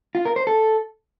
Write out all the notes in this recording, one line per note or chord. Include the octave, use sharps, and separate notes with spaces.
F4
A#4
C5
A4